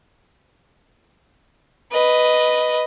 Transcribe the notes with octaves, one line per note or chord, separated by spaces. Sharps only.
B4 D#5